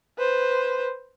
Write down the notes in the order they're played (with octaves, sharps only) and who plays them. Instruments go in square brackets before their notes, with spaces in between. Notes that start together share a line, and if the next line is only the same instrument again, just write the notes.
[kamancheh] B4 C5